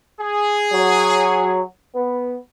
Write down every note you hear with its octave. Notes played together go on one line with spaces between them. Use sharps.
G#4
F#3
B3